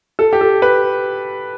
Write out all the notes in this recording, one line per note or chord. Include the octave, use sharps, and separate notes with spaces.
A4
G4
A4
B4